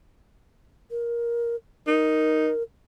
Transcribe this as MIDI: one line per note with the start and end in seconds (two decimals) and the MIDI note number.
0.91 1.55 70
1.87 2.50 63
1.87 2.63 70